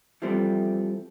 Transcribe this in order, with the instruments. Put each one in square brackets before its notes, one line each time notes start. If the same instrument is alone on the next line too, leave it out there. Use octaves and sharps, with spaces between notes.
[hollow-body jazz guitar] E3 F3 G3 A3 C4